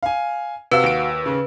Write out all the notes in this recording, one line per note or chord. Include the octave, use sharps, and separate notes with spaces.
F5 G#5
C3 F#4 B4 F5 E6
D#2 D7
C#3